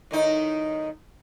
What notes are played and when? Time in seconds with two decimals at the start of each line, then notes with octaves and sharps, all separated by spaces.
0.11 A2 D#3 D#4